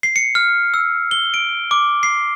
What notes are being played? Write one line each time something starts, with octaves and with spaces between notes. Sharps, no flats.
C7
C#7
F6
E6
G7
D7
D6
C7